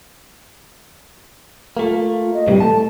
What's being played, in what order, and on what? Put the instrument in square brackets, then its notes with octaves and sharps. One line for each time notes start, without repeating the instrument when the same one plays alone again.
[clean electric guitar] A3 A#3 [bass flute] F4
[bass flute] D#5
[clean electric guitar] A2 C3 E3 [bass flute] G3
[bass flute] A3 [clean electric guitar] A5